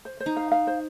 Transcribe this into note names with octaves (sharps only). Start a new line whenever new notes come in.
C5
C5
D#4
F5
F5
C5